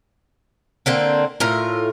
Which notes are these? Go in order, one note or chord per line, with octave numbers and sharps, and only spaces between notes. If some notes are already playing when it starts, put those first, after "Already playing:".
D3 A#3 C4
A2 F4 A#4